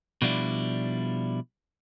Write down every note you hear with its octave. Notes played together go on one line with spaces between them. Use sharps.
B2 F3 G3 D4 E4